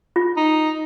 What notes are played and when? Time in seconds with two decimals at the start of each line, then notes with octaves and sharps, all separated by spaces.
0.16 F4
0.37 D#4